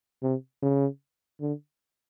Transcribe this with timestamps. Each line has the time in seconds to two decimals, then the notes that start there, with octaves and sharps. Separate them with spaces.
0.22 C3
0.62 C#3
1.41 D3